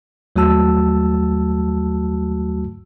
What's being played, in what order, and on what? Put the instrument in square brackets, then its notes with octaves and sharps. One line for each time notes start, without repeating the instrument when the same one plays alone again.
[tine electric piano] D#2 F#3 A3 F#4 A5 E6